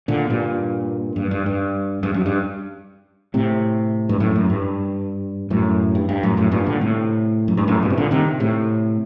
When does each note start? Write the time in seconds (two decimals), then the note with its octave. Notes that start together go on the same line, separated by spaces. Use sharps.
0.08 A#2 D3
0.30 G2 A#2
1.16 G2
1.31 G2
1.46 G2
2.03 G2
2.14 F#2
2.26 G2
3.34 A2 C3
4.09 G2
4.20 F#2 A2
4.36 F#2
4.50 G2
5.50 F#2 A2
5.95 G2
6.09 G2
6.23 F#2 A2
6.37 F#2 A2
6.51 G2 A#2
6.66 A#2 D3
6.81 A2 C3
7.48 F#2
7.57 G2
7.68 F#2 A2
7.82 G2 A#2
7.90 C3
7.97 A#2 D3
8.11 C3 D#3
8.40 A2 C3